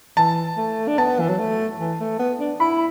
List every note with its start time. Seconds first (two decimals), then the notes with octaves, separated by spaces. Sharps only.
0.17 E3 A5
0.57 A3
0.88 D4
0.98 B3 A5
1.20 E3
1.29 F#3
1.39 A3
1.79 E3
2.00 A3
2.19 B3
2.40 D4
2.60 E4 B5